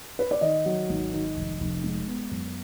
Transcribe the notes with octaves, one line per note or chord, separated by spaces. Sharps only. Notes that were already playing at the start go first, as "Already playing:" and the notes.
B4
D5
D#3 D#5
F#3
G#1
D#3
F1
F1
G#3
B3
F#2